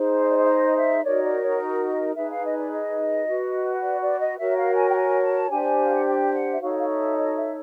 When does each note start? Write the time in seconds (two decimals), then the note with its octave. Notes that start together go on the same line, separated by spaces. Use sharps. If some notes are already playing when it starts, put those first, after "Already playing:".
Already playing: D#4 G#4 C5
0.21 D#5
0.29 D5
0.38 D#5
0.43 E5
0.49 D#5
0.77 E5
1.04 D#4 F#4 A#4 C#5 D5
1.23 D5
1.42 C#5
1.88 D#5
2.15 D#4 G#4 B4 E5
2.30 F5
2.44 D#5
2.58 D5
2.71 D#5
3.27 F#4 B4
3.83 D5
4.02 D5
4.20 D#5
4.38 F#4 A#4 C#5 E5
4.57 F5
4.76 G#5
4.89 G5
4.95 G#5
5.22 A5
5.50 D4 G4 C5 G#5
5.81 F5
5.93 F#5
6.06 G5
6.34 F#5
6.52 E5
6.61 D#4 F#4 A4 C#5 F5
6.78 F5
6.89 E5
7.17 D#5
7.36 E5